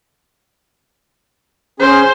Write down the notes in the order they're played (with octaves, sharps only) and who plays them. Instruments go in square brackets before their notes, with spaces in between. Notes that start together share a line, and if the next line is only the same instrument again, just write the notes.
[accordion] C#4 G#4 [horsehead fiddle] C5